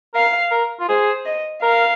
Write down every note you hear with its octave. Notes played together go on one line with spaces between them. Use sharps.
A#4 F5
A#4
F4
G#4 C5
D#5
A#4 F5